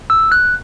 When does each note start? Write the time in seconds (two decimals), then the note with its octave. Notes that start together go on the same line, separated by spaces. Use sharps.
0.10 E6
0.32 F#6